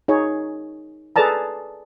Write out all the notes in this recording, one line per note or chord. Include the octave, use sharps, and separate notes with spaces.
D#4 G#4 C#5
G#4 A4 B4 D5 A5 A#5